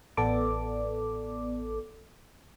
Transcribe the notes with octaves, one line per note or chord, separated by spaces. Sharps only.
A1 B3 A4 D5 D6